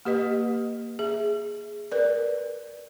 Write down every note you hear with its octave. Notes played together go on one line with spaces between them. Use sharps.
A#3 G4 B4 D#5
G#4 E5
A#4 B4 D5